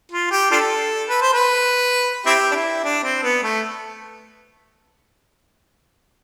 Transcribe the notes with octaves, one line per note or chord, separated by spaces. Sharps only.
F4
G4
D4 F4 A4
B4
C5
B4
C4 E4 G4
D4
E4
D4
C4
B3
A3